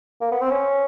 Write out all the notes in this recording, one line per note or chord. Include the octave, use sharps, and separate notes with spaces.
A#3
B3
C4
C#4